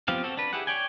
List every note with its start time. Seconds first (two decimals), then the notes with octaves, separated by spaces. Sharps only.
0.08 F3 B3 C4 G4 F5
0.24 C4 F#4 A4
0.37 D4 B4
0.53 E4 G4 G#4 F#5
0.67 C#5 D5 G5 G#5